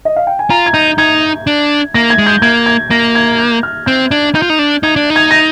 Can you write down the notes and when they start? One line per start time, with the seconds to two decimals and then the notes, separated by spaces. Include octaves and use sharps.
0.05 D#5
0.16 F5
0.27 G5
0.39 G#5
0.50 F4 A#5
0.66 G#6
0.73 D#4 G6
0.98 D#4 G#6
1.47 D4
1.94 A#3 A#6
2.10 G#6
2.18 G#3
2.26 G6
2.42 A#3 G#6
2.66 G#6
2.91 A#3 A#6
3.15 G#6
3.39 G6
3.63 F6
3.86 C4 G6
4.11 D4 G#6
4.35 D#4 G6
4.42 F4
4.50 D#4
4.59 D4
4.83 D#4 G#6
4.96 D4
5.10 D#4
5.16 G#6
5.31 A#6